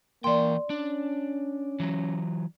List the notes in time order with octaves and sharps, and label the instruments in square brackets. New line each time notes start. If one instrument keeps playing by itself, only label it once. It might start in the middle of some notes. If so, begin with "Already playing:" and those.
[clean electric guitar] E3 G5 [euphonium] A#3 [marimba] D5 C6
[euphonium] C#4 [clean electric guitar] D4
[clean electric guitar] E3 F#3